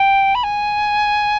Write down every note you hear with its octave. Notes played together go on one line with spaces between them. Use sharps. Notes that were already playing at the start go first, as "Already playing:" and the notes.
Already playing: G5
B5
G#5